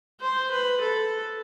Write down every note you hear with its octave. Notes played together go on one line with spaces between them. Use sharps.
C5
B4
A4